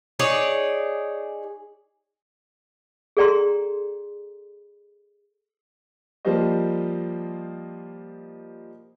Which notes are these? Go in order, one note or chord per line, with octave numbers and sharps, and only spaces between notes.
D#4 G#4 C#5 D5
G#4 A4 D5 G5 A#5 C6
F3 G3 A#3 G4 C5 D#5